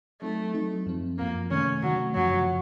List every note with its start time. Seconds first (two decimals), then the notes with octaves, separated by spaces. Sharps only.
0.22 F#3 A3 C4 D#4 A4
0.54 F#3 C4 D#4 A4
0.86 F#2 F3 C4
1.18 F#2 F3 A#3 C4
1.50 C3 D#3 A3 C#4
1.82 C3 D#3 F#3 A3
2.14 F#2 C#3 F3 F#3